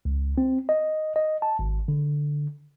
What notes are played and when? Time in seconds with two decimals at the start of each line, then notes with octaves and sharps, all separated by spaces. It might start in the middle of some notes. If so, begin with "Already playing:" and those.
0.05 C#2
0.38 C4
0.69 D#5
1.16 D#5
1.42 A5
1.59 G#1
1.88 D3